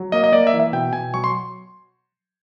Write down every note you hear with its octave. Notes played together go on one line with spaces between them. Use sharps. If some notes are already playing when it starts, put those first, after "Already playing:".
Already playing: F#3
A#3 D#5
D#5
A#3 D5
E5
E3
E5
B2 G5
B2 G#5
F#3 C#6
C6